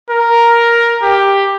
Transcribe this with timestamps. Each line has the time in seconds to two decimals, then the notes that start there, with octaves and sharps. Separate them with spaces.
0.10 A#4
1.03 G4